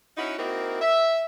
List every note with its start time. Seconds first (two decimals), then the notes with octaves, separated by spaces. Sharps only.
0.17 C#4 D#4 E4 F#4
0.38 A#3 C4 D#4 E4 F#4 A#4
0.82 E5